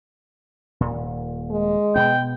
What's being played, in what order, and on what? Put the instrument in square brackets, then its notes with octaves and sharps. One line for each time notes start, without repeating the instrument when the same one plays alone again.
[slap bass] D#1 A#2
[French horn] G#3
[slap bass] B2 B3 [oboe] G5